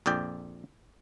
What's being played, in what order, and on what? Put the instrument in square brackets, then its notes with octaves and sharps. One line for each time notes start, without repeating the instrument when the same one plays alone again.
[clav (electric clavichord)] A#1 F2 D5 G5